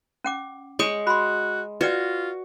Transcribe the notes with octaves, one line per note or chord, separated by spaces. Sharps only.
C#4 F#5 D6
G#3 C#5 C#6 D#6
F#4 B5 C6
F4 F#4 B4 D5 F#5